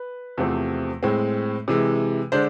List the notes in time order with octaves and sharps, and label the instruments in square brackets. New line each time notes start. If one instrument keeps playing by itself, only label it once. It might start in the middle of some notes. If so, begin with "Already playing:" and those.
Already playing: [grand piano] B4
E2 C3 F3 A3 C4
A2 G#3 C4
C3 E3 G#3
D3 G#3 D4 C5